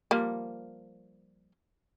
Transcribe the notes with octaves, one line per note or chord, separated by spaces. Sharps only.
F3 G3 A#3